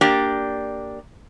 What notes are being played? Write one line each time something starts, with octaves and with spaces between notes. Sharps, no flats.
A#3 D4 G4 D5